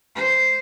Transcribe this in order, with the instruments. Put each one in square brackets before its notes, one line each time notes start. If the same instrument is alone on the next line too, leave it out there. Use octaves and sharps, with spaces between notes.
[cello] C5